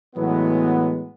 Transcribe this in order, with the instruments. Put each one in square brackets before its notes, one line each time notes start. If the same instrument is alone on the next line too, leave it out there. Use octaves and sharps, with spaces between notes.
[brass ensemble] A2 E3 F#3 G#3 B3